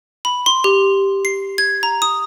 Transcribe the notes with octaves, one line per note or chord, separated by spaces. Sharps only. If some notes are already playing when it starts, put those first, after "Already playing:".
B5
C6
G4
C7
G#6
A#5
D#6